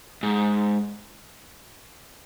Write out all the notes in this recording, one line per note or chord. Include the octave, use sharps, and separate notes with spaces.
G#2